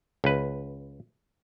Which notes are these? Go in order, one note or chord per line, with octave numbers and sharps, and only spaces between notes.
C#2 B4